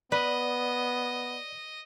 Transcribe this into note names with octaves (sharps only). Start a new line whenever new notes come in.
B3 B4 D5 D#5